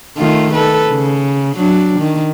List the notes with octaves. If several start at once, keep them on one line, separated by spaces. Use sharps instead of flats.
D#3 A3 F4
A4 B4
C#3
F#3 D4
D#3